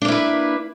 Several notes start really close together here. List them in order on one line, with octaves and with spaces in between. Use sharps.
D4 A#3 E4 B4